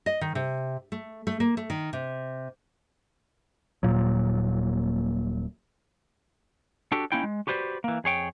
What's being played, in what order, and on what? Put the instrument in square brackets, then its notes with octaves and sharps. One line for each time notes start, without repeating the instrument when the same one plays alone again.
[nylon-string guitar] D#5
D#3
C3
A3
A3
A#3
A3
D#3
C3
[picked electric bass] D#1 B1 A#2 F#3
[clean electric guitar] D4 F#4 G4 A4
A#3 C#4 D#4 E4 G5
G#3
F#4 G4 B4 C5 D5
E3 A#3
F2 G#4 C#5 G5